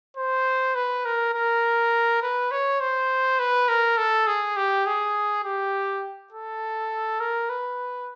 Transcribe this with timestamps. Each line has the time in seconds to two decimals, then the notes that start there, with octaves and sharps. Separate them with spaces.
0.17 C5
0.75 B4
1.05 A#4
1.34 A#4
2.22 B4
2.51 C#5
2.80 C5
3.39 B4
3.69 A#4
3.98 A4
4.27 G#4
4.57 G4
4.86 G#4
5.44 G4
6.33 A4
7.20 A#4
7.49 B4